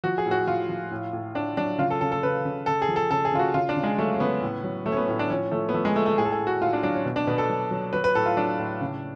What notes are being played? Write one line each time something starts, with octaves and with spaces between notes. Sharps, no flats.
F3 F#4
G#4
A2
F#4
F3 F4
F3
A2
A2
A2 D4
F#3 D4
C#3 F4
A4
C#3 A4
A4
C#3 B4
C#3
C#3 A4
G#4
F3
A4
C#3 A4
G#4
C#3 F4
F#4
C#3 F4
D4
C#3
G#3
F#3 A3
C#4
C#3 B3
A2
F#3
F#3 A3
C#4
B3
A2 C#4
D4
F3 C#4
F3 A3
B3
F3 A3
G#3
F3 A3
A3
A2 G#4
A4
G#4
A2
F#4
A2 F4
D4
F#3 D4
C#4
B2
D4
B2 B3
A4
F#3
F#3
F#3 B4
B4
A2 A4
F4
F#3 D4
A2
C#3